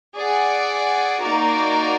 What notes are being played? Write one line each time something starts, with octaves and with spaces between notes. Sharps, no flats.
G#4 D5 F#5
A#3 D#4 F#4 A#4 D5